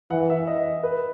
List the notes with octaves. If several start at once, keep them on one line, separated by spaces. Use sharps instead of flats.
E3 F#5
E5
D#5
B4